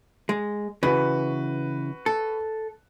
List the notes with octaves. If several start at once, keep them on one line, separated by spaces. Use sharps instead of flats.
G#3
C#3 E3 F#4 B4
A4